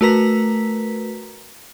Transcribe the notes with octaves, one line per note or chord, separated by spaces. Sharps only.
A3 F#4 A#4 B4 A#5 B6